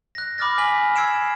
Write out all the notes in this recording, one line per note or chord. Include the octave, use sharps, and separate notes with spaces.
F#6 A#6
B5 D6 D#6 F6 A6 A#6
G#5 F6 B6 F#7
E6 G#6 C7 D7 E7